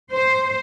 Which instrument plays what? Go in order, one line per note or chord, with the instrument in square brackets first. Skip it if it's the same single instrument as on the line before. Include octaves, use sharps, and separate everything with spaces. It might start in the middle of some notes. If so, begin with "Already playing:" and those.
[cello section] C5